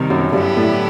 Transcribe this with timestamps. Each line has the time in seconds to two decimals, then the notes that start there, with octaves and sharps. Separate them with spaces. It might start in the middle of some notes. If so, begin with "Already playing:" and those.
Already playing: C3 D#3 G3
0.10 F#2
0.32 G2 D3 F#3 B3 E4 G4
0.56 A2